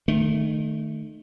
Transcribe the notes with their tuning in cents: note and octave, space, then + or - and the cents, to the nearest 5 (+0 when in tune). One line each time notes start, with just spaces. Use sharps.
D#3 -25 A3 +0